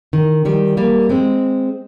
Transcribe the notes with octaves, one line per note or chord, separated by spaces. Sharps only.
D#3
D#3 G3
G3 A#3
G#3 C4